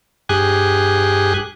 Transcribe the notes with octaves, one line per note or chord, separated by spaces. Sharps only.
G2 G4 G#4 G#5 F#6